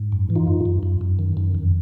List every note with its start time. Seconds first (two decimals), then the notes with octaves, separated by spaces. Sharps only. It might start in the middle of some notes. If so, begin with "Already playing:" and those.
Already playing: G#2
0.12 F#2
0.30 E3
0.36 D#4 F4
0.47 F#2
0.66 F#2
0.83 F#2
1.01 F#2
1.19 D#3
1.37 F#2
1.55 F2